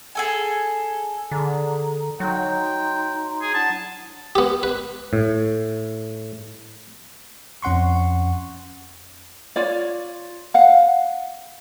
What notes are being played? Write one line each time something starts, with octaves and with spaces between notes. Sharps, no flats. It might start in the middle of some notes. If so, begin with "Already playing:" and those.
G#4 A4 G#5
D3 G#4 A#5
F#3 D#4 G5 A#5 C6
G#4
D4 E4 F#5 A5
B3 G4
B4
A2
F2 C#4 F#5 C6 C#6
F4 C#5 D5
F5 F#5